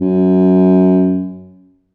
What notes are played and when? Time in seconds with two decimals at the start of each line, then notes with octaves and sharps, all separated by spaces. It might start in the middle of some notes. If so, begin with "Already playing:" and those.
0.01 F#2